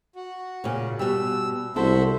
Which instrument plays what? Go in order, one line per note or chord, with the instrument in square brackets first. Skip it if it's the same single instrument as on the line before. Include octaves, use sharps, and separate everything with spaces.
[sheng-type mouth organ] F#4
[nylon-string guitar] A#2 C#3
[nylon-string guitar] B2 G3 [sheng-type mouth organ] E6
[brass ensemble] C2 [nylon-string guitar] E4 A4 [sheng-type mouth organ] F#4 C5 E5